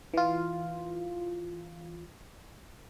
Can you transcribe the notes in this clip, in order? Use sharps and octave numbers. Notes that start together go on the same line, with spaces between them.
E3 F4